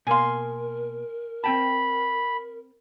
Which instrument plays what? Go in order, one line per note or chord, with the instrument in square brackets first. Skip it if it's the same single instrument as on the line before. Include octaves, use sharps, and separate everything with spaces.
[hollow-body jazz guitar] B2 A#3 F5 [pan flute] A#4 [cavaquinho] G#5 C6
[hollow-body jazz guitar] C4 G5 A5 [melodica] B5